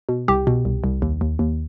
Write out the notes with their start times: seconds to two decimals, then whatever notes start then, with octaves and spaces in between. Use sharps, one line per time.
0.09 B2
0.28 C2 G4
0.47 B2
0.65 C2
0.84 C2
1.02 D#2
1.21 D#2
1.39 D#2